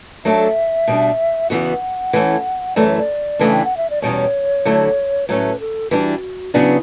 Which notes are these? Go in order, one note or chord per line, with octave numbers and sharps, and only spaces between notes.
F#3 A3 D4 F#4 A4 E5
B2 G3 D4
E2 C#3 E3 B3 F#4 F#5
E3 A3 C#4
F#2 E3 A3 D5
C#5
D5
C#3 E3 A3 D4
G5
F#5
E5
D5
E2 B2 G3 C#4 C#5
D3 F#3 A3 E4
A2 F#3 A3 C#4 B4
A4
E3 G3 D4 F#4
C#3 F#3 B3 D4 E4